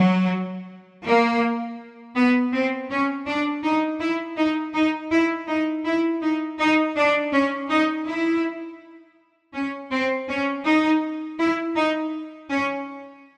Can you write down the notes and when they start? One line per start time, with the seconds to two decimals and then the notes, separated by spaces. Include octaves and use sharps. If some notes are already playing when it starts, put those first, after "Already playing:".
Already playing: F#3
1.05 A#3
2.16 B3
2.52 C4
2.90 C#4
3.26 D4
3.63 D#4
4.00 E4
4.37 D#4
4.73 D#4
5.10 E4
5.47 D#4
5.85 E4
6.22 D#4
6.58 D#4
6.96 D4
7.32 C#4
7.69 D#4
8.06 E4
9.53 C#4
9.91 C4
10.28 C#4
10.64 D#4
11.38 E4
11.76 D#4
12.49 C#4